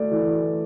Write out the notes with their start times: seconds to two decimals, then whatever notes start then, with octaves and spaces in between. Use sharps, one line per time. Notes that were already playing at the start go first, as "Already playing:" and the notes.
Already playing: A3 D5
0.11 E3